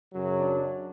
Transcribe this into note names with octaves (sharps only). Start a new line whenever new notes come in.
F#2 C#3 F#3
D4